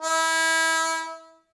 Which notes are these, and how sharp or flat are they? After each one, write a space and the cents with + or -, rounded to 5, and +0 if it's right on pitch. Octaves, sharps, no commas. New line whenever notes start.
E4 -25